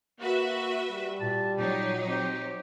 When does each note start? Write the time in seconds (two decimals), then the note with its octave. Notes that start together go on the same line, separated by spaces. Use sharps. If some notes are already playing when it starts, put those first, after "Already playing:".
0.20 A#3 F#4 B4 E5
0.91 G3
1.21 A#2 A5
1.59 A#2 F#3 D#4 G4
2.08 C4 G4